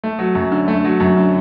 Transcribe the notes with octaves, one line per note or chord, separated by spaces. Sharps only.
A3
F#3
F#2
D3
A3
F#3
F#2
D3